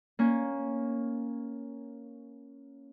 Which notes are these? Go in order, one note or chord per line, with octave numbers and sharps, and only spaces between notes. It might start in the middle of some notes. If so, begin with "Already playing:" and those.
A#3 C#4